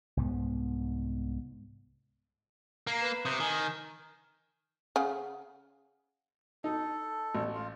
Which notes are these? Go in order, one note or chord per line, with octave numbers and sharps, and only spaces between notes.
C2 G#2 B3
A#3 A#5 C7
B4 E7
C3 D#6 G6
D#3 G#5
C#3 G#4 F#5
D#4 A4
A1
F4